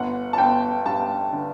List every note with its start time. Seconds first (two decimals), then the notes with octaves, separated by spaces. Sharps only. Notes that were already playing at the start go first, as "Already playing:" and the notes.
Already playing: G1 F#5
0.33 A5
0.38 G1 G5
0.86 G2 A5
1.33 D3